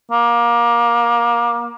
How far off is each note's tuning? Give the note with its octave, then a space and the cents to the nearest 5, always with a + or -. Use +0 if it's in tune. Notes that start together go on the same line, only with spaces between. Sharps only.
A#3 +20